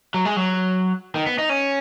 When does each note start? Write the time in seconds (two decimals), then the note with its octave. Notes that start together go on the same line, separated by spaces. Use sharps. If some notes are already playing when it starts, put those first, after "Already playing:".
0.14 F#3
0.25 G#3
0.36 F#3
1.15 D#3
1.26 B3
1.39 D#4
1.50 C#4